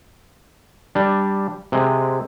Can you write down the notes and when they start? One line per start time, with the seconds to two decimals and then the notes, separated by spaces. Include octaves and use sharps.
0.95 G3 D4
1.72 C3 G#3